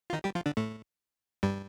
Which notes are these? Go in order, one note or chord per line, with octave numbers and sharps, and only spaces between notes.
F4
D#3 D#4
G3 G4
F3 F4
D3 D4
A2 A3
G2 G3